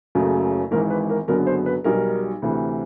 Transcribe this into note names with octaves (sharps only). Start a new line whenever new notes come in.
F#1 F#2 C#3 F#3 A3
G#1 G#2 E3 A#4
B4
A#4
F#1 F#2 D3 F#3 B3 A#4
C5
B4
B1 B2 G3 A#4
D2 C3 E3